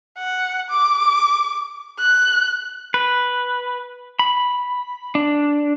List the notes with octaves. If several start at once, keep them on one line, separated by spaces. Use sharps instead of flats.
F#5
D6
F#6
B4
B5
D4